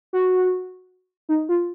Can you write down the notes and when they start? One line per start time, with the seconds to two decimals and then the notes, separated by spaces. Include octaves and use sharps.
0.13 F#4
1.29 D#4
1.49 F4